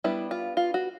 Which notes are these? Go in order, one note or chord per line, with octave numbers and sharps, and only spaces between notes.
G3 B3 D4 E4
F4
F4
F#4